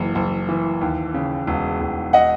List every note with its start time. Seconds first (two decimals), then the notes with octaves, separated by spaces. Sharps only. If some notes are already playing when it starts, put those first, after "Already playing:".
Already playing: F#1 E3
0.15 F#1
0.49 E3
0.81 D#2
1.14 C#3
1.47 E1
1.81 E1
2.13 D#5 F#5